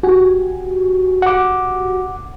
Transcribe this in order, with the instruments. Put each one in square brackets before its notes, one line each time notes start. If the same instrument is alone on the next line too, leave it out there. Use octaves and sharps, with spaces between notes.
[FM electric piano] F#4 G4 G#5
[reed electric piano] F#5 D6